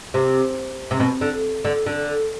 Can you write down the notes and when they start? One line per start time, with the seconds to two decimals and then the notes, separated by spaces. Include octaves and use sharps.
0.14 C3
0.91 C3
1.00 B2
1.21 D3
1.65 D3
1.86 D3